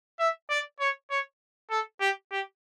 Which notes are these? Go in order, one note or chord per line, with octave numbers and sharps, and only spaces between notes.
E5
D5
C#5
C#5
A4
G4
G4